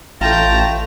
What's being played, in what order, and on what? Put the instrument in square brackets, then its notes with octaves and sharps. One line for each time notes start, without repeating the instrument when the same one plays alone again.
[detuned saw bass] A1 [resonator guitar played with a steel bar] A3 F4 [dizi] G5 [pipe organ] A5 A#5